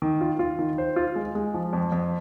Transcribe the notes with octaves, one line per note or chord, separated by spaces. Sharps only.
D#3
F4
F4
D#3
C5
F4
G#3
G#3
F3
F2
F2